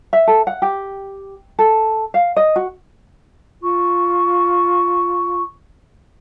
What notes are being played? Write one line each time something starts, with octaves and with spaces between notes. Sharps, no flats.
E5
A4
F#5
G4
A4
F5
D#5
F#4
F4 C#6